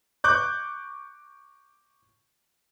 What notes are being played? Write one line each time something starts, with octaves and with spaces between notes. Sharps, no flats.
C#6 D6 F#6 G6